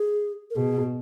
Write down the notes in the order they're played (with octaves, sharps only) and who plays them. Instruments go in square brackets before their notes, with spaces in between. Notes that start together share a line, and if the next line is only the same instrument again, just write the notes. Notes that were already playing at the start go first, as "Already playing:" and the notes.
Already playing: [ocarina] G#4
A#4
[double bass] B2 [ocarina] G#4